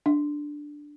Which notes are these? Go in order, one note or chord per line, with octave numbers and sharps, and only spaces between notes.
D4